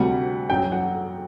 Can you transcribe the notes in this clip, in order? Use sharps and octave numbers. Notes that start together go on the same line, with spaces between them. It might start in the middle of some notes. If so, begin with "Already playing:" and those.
Already playing: D2 C3 G3 F#5
F#2 F#3 G5
F#5